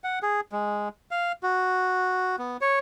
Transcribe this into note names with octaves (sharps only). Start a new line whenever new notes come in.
F#5
G#4
G#3
F5
F#4
B3
C#5